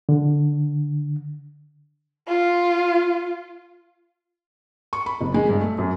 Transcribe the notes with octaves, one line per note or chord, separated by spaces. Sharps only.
D3
F4
C#6
B5
F#1
G#3
G2
A3
F#2